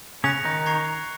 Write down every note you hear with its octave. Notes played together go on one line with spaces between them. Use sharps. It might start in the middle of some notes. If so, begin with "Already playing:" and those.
C#3 C#4 F#6 A#6 C#7 F7
D#3 D#4
A#5 C#6 G#6 C7